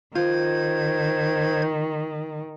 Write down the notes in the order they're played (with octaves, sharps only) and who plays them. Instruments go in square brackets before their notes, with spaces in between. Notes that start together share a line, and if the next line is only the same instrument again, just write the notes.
[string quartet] D#3 [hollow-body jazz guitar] F4 [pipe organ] C5 G#6